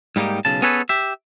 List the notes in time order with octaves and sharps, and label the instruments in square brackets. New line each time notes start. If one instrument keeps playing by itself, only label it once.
[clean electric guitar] G#2 G3 A#3 D#4 G4
B1 C#3 A5
B3 C#4 G#4 A4 B4 C#5
G4 E5